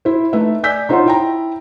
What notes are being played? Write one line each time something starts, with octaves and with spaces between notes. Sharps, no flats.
E4 C5
A3 D#4 B4 E5
D5 G#5 E6 G6 B6
D#4 F4 C5 C#5 F#5 C6
E4 G5 A#5